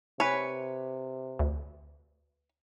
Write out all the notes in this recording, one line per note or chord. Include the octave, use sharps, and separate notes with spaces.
C3 B4 C#5 G#5
D2